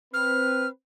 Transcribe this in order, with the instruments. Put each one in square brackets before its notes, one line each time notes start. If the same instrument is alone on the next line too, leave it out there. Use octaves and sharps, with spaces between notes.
[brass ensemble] C4 B4 [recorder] F6